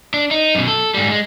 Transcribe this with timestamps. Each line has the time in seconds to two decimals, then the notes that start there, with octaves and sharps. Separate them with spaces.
0.14 D4
0.31 D#4
0.55 F#2 B2
0.68 A4
0.94 G#2 G3
1.10 G#3